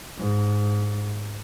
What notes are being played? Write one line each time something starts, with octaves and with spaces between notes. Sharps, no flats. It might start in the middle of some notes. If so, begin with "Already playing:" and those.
G#2